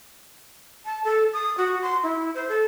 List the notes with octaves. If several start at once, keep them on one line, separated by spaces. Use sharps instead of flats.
A5
A4
D#6
F#4
C6
E4
C5
A4